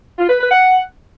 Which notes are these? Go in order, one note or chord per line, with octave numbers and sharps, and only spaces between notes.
F4
B4
B4
F#5